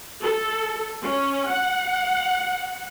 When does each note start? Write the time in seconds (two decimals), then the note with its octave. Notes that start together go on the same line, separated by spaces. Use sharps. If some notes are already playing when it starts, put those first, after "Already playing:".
0.21 A4
1.03 C#4
1.51 F#5